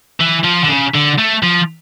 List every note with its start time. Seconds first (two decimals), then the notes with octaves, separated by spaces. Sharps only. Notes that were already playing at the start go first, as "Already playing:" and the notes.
0.20 E3
0.44 F3
0.64 D3
0.68 C#3
0.94 D3
1.18 A3
1.43 F3